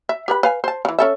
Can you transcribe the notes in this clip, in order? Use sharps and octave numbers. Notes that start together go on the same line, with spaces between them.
E5
G4 B4 B5
B4 F5 G#5
C5 A5
C#3 E3
C#4 A4 E5